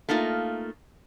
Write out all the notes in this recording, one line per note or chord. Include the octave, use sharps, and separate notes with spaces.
A3 A#3 D#4 F4